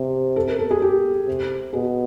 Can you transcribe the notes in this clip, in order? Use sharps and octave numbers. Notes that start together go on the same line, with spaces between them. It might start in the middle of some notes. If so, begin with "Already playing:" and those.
Already playing: C3
A4
A#4
A4
G#4
G4
C3
B2 G#4